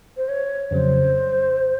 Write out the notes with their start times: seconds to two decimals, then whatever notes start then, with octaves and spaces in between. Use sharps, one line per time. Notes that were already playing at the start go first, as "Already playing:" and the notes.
0.17 C5
0.29 C#5
0.71 F2 C#3 F#3 C5